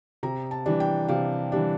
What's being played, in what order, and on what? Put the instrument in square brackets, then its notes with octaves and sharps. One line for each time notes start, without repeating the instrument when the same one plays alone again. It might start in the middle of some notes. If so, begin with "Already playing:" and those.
[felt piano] C3 A#5
A5
E3 G3 D4
G5
C3 F5
E3 G3 D4